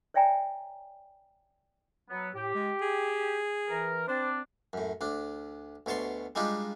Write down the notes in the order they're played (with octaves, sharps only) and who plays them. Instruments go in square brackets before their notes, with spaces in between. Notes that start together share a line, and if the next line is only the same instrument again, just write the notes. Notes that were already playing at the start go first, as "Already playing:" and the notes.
[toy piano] C#5 D5 E5 G5 G#5 A#5
[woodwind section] F#3 B3
[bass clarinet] A2 [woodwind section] G4
[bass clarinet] G#3
G#4
[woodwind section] E3 A#4
[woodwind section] C4 D4 [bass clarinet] C5
[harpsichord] F#2 A2
D2 D4
D2 B2 C#5 A5 C6
G3 G#3 D4 D#4 F4 G4